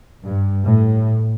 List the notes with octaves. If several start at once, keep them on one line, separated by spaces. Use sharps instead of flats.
G2
A2